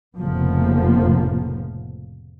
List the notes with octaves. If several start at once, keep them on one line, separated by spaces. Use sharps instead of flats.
F1 A2 C#3 F3 A#3 B3